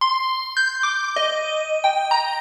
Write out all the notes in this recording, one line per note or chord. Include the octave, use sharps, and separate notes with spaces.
C6
G6
D6
D#5
G5
A#5